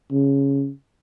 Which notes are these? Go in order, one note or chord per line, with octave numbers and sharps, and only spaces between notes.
C#3